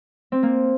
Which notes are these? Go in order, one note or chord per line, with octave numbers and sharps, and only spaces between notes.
C4
A#3